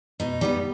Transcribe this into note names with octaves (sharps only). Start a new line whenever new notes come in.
B2 D#4
G3 B3 D#4